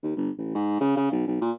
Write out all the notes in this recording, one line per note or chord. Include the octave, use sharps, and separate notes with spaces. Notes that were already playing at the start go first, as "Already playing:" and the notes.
D#2
G1
A1
G#2
C#3
C#3
B1
B1
A#2